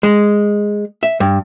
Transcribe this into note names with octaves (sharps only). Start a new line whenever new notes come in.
G#3
E5
G2